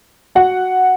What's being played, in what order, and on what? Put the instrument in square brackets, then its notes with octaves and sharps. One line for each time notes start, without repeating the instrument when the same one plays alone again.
[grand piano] F#4 F#5